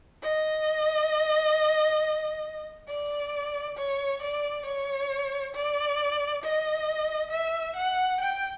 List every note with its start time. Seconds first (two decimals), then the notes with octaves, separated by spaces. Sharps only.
0.22 D#5
2.89 D5
3.77 C#5
4.22 D5
4.66 C#5
5.55 D5
6.43 D#5
7.31 E5
7.76 F#5
8.20 G5